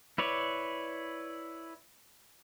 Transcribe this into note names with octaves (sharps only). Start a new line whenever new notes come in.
E4 B4 C#5 D5